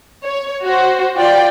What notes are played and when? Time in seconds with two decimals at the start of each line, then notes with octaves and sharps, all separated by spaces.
0.24 C#5
0.64 F#4 C5
1.17 F4 D5 G5